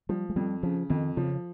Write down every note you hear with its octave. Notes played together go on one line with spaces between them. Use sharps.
F3 G3
G#3
F2 G3
C#3 F3
F2 D#3
C#3 F3